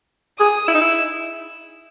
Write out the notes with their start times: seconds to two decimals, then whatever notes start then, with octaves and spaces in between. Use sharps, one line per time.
0.39 G#4 D#6
0.67 E4 E6
0.74 D#4
0.81 E4